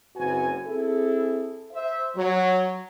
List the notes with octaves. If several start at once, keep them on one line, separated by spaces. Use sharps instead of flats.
F#1 F#2 C4 F#4 B4 G#5
C4 E4 G#4 A4
C5 E5
F#3